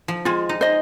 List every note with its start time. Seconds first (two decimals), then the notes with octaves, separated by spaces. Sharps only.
0.08 F3
0.25 G#3 F4
0.49 D#4
0.61 C5 D#5